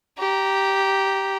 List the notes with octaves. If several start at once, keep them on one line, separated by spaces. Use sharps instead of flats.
G4 A#5